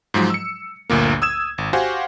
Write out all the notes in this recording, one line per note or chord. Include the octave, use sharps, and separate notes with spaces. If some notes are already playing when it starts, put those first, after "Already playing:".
G#2 F3 F#3 G#3
E6 C#7
G1 D2 A#2 A#3
D#6 E6 G#6 E7
G#1
F#4 G4 C5 F5 F#5 G#5